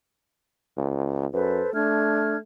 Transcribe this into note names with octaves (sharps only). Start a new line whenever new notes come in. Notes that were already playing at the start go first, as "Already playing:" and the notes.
C#2
F#2 A4 B4 C5
A3 D4 F6 G#6